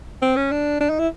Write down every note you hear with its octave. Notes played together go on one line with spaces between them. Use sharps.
C4
C#4
D4
D4
D#4
E4